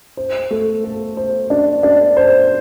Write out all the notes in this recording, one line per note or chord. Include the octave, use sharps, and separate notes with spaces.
C5
A3
A4
C5
D4
D4
C5